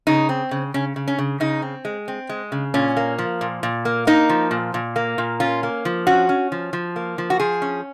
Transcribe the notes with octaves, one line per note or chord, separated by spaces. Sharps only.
C#3 D#4
C4
C#3
C#3 C#4
C#3
C#4
C#3
C#3 D#4
C4
G#3
C4
G#3
C#3
A#2 C#4
A#3
F3
A#2
A#2
A#3
A#3 D#4
F3
A#2
A#2
A#3
A#2
C#4 F4
A#3
F3
C#4 F#4
C#4
F3
F3
A#3
F3
F#4
F3 G#4
C#4